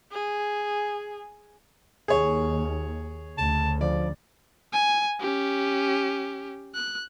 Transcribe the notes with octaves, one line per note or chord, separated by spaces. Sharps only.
G#4
D#2 G#4 C#5
D2 C#3 A5
F3 D5
G#5
C#4 G4
F#6